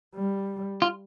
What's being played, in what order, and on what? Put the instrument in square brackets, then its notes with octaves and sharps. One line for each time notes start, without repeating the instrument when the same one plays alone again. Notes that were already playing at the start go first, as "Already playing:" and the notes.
[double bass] G3
[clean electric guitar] F4